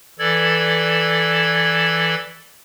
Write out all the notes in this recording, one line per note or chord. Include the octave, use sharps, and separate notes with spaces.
E3 A4 D5 G#6